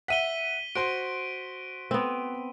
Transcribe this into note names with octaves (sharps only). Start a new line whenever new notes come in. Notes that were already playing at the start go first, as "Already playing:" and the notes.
E5 F#5 B6 D#7 G7
F#4 C5 C6 D7
B3 C4